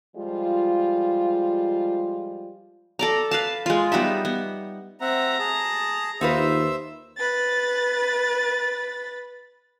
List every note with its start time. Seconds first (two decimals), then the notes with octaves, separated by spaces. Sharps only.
0.16 F3 G3 G#3 F4
2.99 A4 D5 A#5
3.31 B4 F5 A5
3.66 G#3 F4
3.92 G3 B3 D#4 E5
4.25 B3
5.01 C4 E5 F#5 A#5
5.39 G#4 A5
6.21 D#2 D#4 F4 B4 C5 E5 E6
7.17 B4 A6